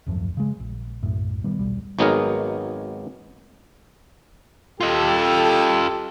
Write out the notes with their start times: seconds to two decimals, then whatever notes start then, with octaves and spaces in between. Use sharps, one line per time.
0.06 D#1 G#1 F#2 F3
0.37 C#3 G#3
0.59 A#1
1.03 B1 F#2 A2
1.44 B2 D#3 G3 B3
1.59 D#1 B1 G3
1.99 G#1 F#3 B3 D#4 G#4 A#4
4.81 F4 G4 A4 D#5